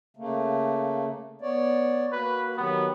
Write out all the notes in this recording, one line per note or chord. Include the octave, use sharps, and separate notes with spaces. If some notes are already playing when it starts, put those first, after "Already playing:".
C#3 A3 A#3
B3 C#5 D5
A#3 F#4 B4
D#3 F#3 B3 G4